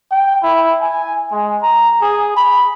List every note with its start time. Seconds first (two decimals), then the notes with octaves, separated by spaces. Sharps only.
0.11 G5
0.43 E4
0.81 G#5
1.32 G#3
1.63 A#5
2.02 G#4
2.36 B5